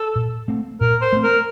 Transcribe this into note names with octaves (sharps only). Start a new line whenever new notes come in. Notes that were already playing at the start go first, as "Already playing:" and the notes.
Already playing: A4
A#2
A3 C4
A#2 A#4
C5
A3 C4
A#4